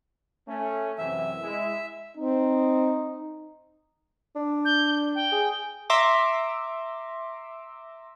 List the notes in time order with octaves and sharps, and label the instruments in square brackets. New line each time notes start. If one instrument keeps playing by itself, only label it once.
[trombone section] A3 C#4
[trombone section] F#2 C3 E3 [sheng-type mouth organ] E5
[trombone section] G#3 E4
[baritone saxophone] C4 [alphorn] D#4
[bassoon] D4
[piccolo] G6
G5
[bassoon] G#4
[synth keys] E5 A#5 C6 D6